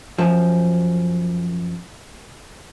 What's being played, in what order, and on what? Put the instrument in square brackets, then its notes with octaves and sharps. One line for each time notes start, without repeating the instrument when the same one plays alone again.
[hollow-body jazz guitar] F#2 F3